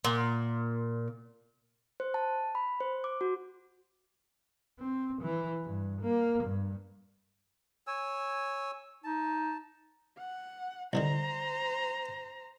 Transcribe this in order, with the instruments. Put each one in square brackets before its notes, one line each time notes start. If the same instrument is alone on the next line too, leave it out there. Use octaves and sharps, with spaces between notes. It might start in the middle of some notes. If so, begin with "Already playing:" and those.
[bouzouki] A#2
[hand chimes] C5
A5
B5
C5
D6
F#4
[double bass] C4
E3
G2
A#3
G2
[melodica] C#5 G#5 E6
[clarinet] D#4 [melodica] A5
[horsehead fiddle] F#5
[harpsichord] C2 D3 D#3 [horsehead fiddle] C5 A#5